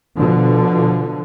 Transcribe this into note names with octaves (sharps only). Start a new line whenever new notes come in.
B2 D3 F3